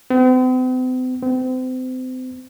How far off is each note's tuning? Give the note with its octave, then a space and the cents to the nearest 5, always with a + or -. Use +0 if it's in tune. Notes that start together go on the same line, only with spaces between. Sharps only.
C4 -45
C4 -35